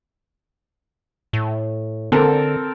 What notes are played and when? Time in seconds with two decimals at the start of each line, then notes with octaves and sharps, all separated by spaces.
1.33 A2
2.12 D3 C4 A4 A#4